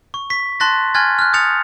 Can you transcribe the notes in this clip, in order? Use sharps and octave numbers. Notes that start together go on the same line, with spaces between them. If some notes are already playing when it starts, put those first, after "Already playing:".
C#6
C#6 B6
A5 C6 F#6 A6 A#6
G#5 C6 F6 F#6 G#6 A6
F6 F#6
D#6 G6 A6 C#7 F7